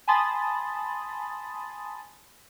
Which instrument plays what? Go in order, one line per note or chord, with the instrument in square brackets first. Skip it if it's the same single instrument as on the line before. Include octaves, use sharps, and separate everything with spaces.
[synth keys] G#5 A5 B5 C6 D#6 A6